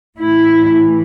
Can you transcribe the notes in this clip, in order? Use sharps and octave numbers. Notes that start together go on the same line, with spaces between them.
A2 E3 E4